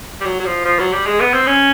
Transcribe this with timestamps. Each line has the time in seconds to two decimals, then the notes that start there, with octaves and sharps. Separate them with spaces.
0.21 G3
0.25 F#3
0.40 F#3
0.46 F3
0.65 F3
0.79 F#3
0.92 G3
1.06 G#3
1.20 B3
1.34 C4
1.47 C#4